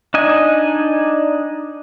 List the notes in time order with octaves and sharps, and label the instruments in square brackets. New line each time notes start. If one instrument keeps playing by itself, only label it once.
[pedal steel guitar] D4 D#4 D#5 G#5